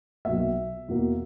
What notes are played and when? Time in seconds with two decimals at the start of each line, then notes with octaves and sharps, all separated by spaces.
0.25 B1 B2 A#3 E5
0.88 E2 B2 A#3